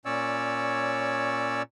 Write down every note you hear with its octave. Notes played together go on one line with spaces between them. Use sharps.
A#2 C#4 C#5 D5 E6